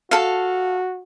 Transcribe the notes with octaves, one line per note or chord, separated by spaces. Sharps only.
F#4 A4 F5